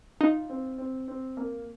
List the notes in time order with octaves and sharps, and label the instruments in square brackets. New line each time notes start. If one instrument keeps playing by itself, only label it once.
[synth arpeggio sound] D#4 [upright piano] F4
[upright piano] C4
C4
C4
A#3